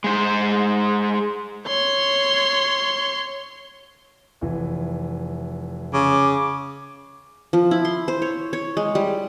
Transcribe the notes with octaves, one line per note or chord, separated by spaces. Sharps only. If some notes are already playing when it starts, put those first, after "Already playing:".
G#3 C5
C#5 C6
F1 E3
C#3 D6
F3
E4
C6
C5
C#5
C#5
G#3
G3